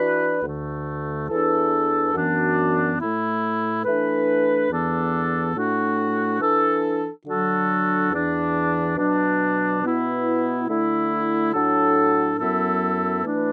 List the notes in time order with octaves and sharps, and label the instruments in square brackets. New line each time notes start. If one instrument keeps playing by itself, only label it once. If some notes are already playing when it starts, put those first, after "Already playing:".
Already playing: [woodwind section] E3 D4 F#4 B4
D2 D3 A3
E2 E3 D4 A4
F#2 E3 B3 D4 F#4
A2 A3 E4
E3 A3 D4 B4
E2 E3 B3 D4 A4
A2 A3 D4 F#4
E3 D4 A4
D3 F#3 D4 F#4 A4
E2 E3 D4
B2 F#3 D4
B2 B3 E4 B4
D3 A3 E4
A2 F#3 D4 A4
F#2 F#3 B3 E4 A4
E3 A3 D4 B4